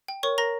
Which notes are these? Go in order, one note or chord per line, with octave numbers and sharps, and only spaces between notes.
G5
A#4 C#5 C#6
A#4 A#5 A#6